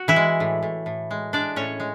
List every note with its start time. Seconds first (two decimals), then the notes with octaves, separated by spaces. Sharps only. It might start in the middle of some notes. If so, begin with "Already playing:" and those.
Already playing: F#4
0.08 E3 E4
0.16 G#3
0.40 A2
0.62 A2
0.86 A2
1.11 G#3
1.33 G#3 D4 D5
1.56 A2 C#4 C#5
1.80 G#3